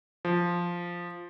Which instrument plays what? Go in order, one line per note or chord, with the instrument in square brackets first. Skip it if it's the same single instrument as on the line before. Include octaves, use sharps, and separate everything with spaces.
[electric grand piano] F3